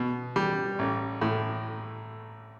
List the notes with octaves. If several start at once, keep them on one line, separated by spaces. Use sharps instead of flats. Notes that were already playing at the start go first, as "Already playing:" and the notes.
Already playing: B2
G3
A1
A2